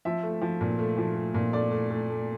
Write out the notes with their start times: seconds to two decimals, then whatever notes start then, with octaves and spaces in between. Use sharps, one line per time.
0.05 F3 E5
0.23 A3
0.42 F3
0.61 A#2
0.79 A3
0.98 F3
1.16 A3
1.34 A#2
1.53 A3 D5
1.71 A3
1.90 A3
2.10 A3